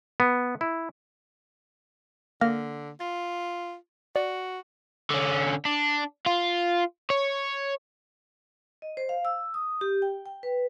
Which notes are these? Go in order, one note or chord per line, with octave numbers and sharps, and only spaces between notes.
B3
E4
D3 A#3 F6 A#6
F4 A6
F#4 D5
D3 C#4
D4
F4
C#5
D#5
C5
F5
E6
D#6
G4
G5
G5
B4